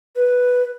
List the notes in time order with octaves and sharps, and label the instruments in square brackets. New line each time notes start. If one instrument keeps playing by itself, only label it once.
[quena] B4